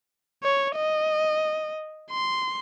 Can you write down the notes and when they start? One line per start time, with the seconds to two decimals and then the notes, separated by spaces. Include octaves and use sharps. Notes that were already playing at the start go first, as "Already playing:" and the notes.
0.43 C#5
0.76 D#5
2.11 C6